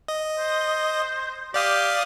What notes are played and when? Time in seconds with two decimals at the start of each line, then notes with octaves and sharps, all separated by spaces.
0.08 D#5
0.39 C5
1.54 G4 D5 F5 D#6